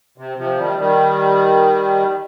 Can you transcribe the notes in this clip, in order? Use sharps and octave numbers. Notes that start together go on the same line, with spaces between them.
C3
C3 F3
D#3 G3
D#3 G3